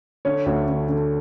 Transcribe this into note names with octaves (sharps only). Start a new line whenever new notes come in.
D3 C#5
D2
D3
D3